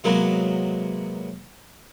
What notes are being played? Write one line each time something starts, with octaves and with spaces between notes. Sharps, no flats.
C3 F#3 G#3 A#3 B3